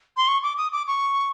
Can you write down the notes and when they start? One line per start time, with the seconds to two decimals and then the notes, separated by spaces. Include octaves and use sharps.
0.17 C6
0.28 C#6
0.43 D6
0.58 D#6
0.72 D6
0.88 C#6